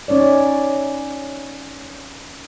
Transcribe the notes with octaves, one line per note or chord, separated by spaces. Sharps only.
C#4 D#4 C#5 D5